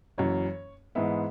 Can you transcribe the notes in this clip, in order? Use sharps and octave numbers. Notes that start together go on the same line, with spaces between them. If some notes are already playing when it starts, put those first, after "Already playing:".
F#1 F#2 E3 C#5
G#2 E3 G#3 B3 E5